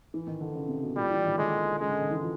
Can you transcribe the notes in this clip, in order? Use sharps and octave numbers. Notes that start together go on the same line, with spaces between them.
E3
D#3
D3
C#3
C3
B2
A#2 G3
E3
D#3
D3 G#3
C#3 G#3
D3
D#3
E3
F3